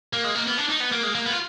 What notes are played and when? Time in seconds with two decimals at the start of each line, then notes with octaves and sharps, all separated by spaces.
0.13 A#3
0.24 G#3
0.35 A#3
0.47 B3
0.58 D4
0.70 D#4
0.81 B3
0.92 A#3
1.03 G#3
1.15 A#3
1.26 B3
1.32 F4